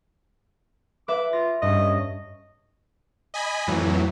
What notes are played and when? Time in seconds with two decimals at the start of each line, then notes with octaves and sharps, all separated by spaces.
1.08 B4 E5 D6
1.33 F4 A#6
1.62 G2 C#4 D#5
3.34 D#5 G#5 B5
3.67 F2 A2 E3 F#3